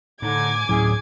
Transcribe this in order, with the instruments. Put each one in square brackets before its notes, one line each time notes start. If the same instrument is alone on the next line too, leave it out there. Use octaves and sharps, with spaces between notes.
[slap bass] A2 [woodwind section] D3 D#4 [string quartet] G#5 D6 G#6
[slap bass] D2 F#3 [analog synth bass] A2 [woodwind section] C#4 G#4